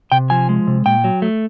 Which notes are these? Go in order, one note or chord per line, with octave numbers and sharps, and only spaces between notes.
C3 G5
F3 G#5
G#3
C3
A#2 G5
F#3
A3